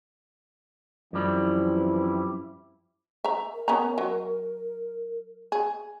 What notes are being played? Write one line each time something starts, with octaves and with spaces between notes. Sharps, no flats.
F#2 E3 F3 G3 C4 E4
E5 A#5
A#4
B3 C#4 A#5
F#3
G#4